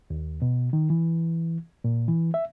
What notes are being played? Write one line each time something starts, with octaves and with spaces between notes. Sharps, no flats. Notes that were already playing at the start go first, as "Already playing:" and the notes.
D#2
B2
D#3
E3
A#2
E3
E5